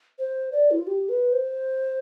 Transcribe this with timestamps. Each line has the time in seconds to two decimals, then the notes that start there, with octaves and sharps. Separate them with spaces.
0.19 C5
0.52 D5
0.71 E4
0.79 F4
0.87 G4
1.09 B4
1.32 C5